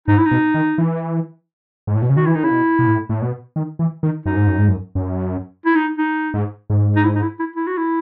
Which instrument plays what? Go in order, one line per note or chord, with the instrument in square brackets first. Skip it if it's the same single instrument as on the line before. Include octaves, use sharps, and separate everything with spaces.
[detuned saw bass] G#2 [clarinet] D#4
[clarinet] E4
D#4
[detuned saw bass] B2
D#3
E3
G#2
A2
B2
C#3
[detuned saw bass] D#3 [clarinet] F#4
[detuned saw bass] E3 [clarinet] E4
[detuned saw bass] D#3 [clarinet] D#4
[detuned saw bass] C#3 [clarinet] E4
[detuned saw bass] B2
B2
A2
A2
B2
D#3
E3
D#3
[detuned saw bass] F#2 [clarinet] D#4
[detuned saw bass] G#2
F#2
G#2
F#2
F#2
[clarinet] E4
D#4
D#4
[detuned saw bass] G#2
G#2
[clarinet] D#4
E4
D#4
E4
E4
E4
F#4
E4